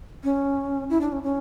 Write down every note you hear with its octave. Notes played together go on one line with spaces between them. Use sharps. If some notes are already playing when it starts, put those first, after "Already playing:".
C#4
E4
D4
C#4
C#4